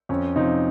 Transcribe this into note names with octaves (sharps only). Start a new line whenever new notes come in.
F2 C#4
C3 F3 C4 D#4